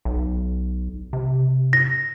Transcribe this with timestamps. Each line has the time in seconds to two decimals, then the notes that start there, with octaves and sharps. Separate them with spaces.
0.05 B1
1.13 C3
1.73 A#6